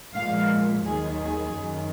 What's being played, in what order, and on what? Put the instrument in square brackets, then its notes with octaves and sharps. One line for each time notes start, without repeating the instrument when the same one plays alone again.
[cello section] A#2 F3 G#3 F5
D#2 D#3 F#3 G#4
G#4
F#2 D#3 F#3